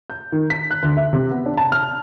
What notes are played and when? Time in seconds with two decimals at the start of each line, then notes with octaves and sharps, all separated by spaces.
0.10 G6
0.32 D#3
0.50 B6
0.71 F#6
0.83 D2
0.97 E5
1.13 C3
1.31 B3
1.46 D4
1.57 A5
1.72 F6